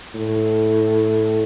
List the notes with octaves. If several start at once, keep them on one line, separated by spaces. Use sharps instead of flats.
A2